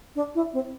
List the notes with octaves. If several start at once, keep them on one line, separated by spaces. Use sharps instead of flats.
D4
E4
C4